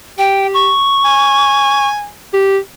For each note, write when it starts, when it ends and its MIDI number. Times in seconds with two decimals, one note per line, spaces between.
0.18 0.71 67
0.18 0.47 79
0.54 1.88 85
1.05 2.08 80
2.33 2.58 67